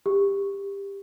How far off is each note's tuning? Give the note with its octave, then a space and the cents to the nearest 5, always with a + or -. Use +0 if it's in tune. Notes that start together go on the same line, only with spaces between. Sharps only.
G4 +20